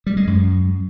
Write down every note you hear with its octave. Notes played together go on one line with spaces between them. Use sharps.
G3
G#3
F#2